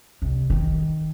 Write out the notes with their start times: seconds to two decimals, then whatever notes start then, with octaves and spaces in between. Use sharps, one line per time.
0.22 C2
0.50 D#3